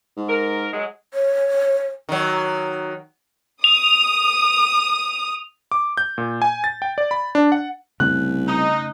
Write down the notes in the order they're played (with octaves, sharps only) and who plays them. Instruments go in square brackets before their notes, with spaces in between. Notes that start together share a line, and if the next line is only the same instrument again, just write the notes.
[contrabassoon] G#2
[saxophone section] A#4
F#3 G#3
[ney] C#5
[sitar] D#3 F#3
[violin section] D#6 [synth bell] F7
[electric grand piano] D6
G6
A#2
G#5
A6
G5
D5
B5
D4
F#5
[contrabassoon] C2 [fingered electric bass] C#3 A3 C#4 [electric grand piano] F#6
[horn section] D#4